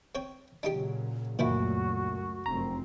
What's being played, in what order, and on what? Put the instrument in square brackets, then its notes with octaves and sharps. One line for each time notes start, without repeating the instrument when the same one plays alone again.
[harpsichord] C4 C#5 G5
[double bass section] A#2 C#3 F#3 [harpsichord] D4 D#4 G4
[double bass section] C#2 F#2 A3 [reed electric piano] A#2 [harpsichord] D#3 F3 E4 [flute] F#4
[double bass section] F1 F#2 C4 [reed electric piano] A#5